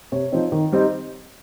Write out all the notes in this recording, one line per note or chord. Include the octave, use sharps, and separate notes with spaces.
C3 C#5
F3 C4 D#4
D#3
G3 C4 D#4